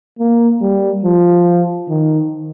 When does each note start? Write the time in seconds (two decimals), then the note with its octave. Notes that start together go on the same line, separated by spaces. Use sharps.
0.19 A#3
0.61 G3
1.04 F3
1.89 D#3